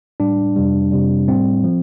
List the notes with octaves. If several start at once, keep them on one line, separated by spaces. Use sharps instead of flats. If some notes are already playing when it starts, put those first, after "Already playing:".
A2 G3 D4
F2 C3 G3
F2 C3 G3
A2 G3 C4
F3